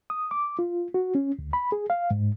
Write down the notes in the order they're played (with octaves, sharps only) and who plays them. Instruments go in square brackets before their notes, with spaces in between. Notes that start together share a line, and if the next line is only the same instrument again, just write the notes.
[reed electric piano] D#6
D6
F4
F#4
C#4
D2
B5
G#4
F5
G#2